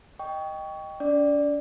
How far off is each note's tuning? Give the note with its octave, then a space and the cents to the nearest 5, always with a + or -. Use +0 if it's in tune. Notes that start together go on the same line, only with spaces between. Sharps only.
D#5 +0 G5 +0 C#6 +20
D4 -45 D5 +0